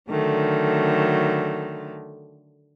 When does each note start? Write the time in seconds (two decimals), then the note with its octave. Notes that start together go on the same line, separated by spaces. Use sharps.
0.10 D3 D#3 F#3 A3